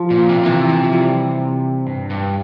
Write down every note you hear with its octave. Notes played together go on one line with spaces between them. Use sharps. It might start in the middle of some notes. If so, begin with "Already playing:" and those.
Already playing: F3
A#2
C3
A#2
C3 E3
E3
F3
G3
G2
G2